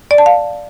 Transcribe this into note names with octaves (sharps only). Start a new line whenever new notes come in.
D5
A5
F5